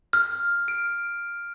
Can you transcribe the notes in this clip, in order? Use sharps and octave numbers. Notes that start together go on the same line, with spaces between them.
F6
D7